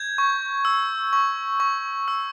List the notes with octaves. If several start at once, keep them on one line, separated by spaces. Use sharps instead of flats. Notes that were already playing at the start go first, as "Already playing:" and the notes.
Already playing: G6 G#6
C#6
E6
C#6
C#6
E6